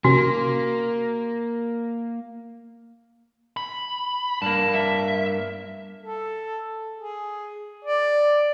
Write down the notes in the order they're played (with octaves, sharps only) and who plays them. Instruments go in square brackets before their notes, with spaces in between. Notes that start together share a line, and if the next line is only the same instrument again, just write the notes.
[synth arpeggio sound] C3 C#4 [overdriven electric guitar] A#3 [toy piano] F#4
[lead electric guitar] B5
[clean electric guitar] G2 A#3 [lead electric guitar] A5
[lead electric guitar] E5
[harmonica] A4
G#4
D5